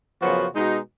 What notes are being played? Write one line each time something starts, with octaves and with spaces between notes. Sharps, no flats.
F#2 C#3 F3 B3 F#4
B2 G#3 D#4 F#4